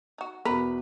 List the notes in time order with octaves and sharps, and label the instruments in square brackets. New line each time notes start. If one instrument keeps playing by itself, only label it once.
[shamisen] D#4 F#4
[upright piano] E2 B2 [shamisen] A#4 [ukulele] B4